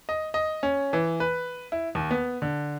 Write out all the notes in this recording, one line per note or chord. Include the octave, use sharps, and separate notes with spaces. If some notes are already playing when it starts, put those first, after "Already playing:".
D#5
D#5
C#4
E3
B4
E4
D#2
B3
D3